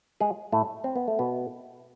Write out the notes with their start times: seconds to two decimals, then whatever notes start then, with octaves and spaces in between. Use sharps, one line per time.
0.20 G#3 G#4
0.52 A2 A3
0.84 C4
0.96 B3
1.08 A3
1.19 B2 B3